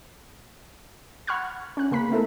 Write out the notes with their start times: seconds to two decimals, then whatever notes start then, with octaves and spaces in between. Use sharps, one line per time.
1.27 F#5 B5 C#6 F6 F#6 G#6
1.77 C#4 F#6
1.91 C#3 A#3 B5 B6
2.11 A3 B3 E4 A4 A#4